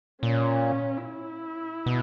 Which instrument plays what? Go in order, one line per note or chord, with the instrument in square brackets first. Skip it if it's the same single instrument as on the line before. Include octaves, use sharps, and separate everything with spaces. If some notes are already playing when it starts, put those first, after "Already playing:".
[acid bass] A#2 [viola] C#4
[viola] E4
[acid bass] B2